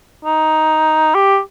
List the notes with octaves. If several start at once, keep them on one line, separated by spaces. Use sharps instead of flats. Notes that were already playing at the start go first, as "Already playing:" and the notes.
D#4
G4